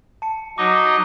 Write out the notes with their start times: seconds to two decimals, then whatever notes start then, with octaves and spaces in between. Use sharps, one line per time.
0.22 A5 C#7
0.58 F#3 D#4 D#5 D6